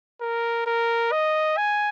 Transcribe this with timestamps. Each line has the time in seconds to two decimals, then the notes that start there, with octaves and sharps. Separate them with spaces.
0.21 A#4
0.66 A#4
1.12 D#5
1.57 G#5